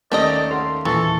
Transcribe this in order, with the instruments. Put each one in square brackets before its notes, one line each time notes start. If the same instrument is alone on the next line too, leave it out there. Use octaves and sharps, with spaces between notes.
[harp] D#2 C#4 [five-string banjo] A3 G4 D#5 [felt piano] A4 A#4 [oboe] D5
[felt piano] A4 F#5 [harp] F5 [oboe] C6
[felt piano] E2 A#2 C#6 [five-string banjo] E3 [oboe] A4